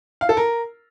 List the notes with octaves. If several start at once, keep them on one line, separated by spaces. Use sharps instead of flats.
F5
A4
A#4